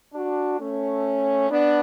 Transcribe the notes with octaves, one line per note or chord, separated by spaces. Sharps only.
D4 F#4
A3 C#4
B3 D4